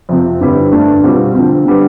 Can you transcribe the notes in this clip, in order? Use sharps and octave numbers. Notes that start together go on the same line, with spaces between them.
F2 C3 F3 C4
G2 D3 G3 C4 E4
G2 D3 A3 D4
B2 G3 C4 F4
D3 F3 C4
D3 G3 B3